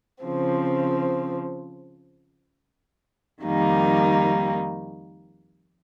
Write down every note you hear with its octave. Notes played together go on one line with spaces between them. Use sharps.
C#3 F3 C4
F2 D#3 G3 A#3 D#4